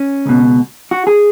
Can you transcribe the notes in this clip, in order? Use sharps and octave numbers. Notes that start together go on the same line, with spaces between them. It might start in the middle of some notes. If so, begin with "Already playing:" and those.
Already playing: C#4
C#2 B2
F#4
G#4